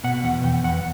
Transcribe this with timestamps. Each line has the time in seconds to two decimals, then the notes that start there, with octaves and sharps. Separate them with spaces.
0.04 B2 F#5
0.24 E2 F#5
0.44 E2 G5
0.64 E2 F#5